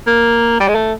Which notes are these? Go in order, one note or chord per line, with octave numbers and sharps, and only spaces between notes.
A#3
G3
G#3
A3